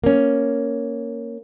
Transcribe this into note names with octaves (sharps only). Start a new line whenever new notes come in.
A#3 C#4